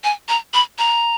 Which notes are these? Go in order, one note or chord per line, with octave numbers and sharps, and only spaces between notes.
G#5
A#5
B5
A#5